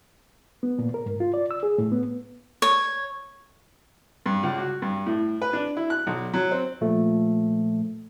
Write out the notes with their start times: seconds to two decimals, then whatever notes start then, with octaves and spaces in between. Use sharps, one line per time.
0.63 B3
0.79 A#2
0.94 A#4
1.06 G#2
1.20 F4
1.34 D5
1.51 E6
1.63 G#4
1.78 A2
1.92 B3
2.62 C#5
4.26 G2
4.43 C#2
4.58 F#4
4.82 G2
5.06 A2
5.41 B4
5.53 D4
5.77 E4
5.90 F#6
6.07 B1
6.34 F#3
6.51 C4
6.81 A#2 F3 A3